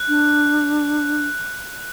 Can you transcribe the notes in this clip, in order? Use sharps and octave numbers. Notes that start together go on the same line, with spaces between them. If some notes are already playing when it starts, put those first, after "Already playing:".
Already playing: F#6
D4